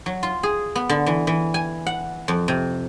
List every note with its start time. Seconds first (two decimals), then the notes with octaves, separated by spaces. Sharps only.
0.06 F#3
0.23 F4
0.43 G#4
0.75 B3
0.89 D3
1.06 E3
1.27 E3
1.54 G#5
1.86 F#5
2.28 F2
2.48 C3